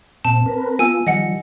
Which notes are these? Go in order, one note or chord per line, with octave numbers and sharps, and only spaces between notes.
A#2 C4 A5
C4 A#4 B4
B3 F4 G#5 E6
D#3 F3 G3 D#5 F#5 C#7